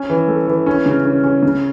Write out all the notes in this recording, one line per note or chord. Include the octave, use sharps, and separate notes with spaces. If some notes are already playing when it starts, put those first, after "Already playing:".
Already playing: C#4
E3
A3
E3
C#4
C#3
C#4
C#4
C#3